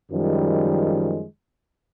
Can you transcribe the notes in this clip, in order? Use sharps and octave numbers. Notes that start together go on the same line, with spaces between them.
F#2 D#3 F3 G3 G#3